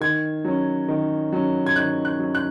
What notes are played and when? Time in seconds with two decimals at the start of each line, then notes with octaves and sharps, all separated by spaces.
0.01 D#3 G#6
0.45 F#3 C#4
0.88 D#3
1.33 F#3 C#4
1.66 G#6
1.76 D#3 F#6
2.05 F#6
2.20 F#3 C#4
2.35 F#6